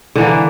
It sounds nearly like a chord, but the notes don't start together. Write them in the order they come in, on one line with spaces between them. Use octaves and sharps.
D3 E3 A#3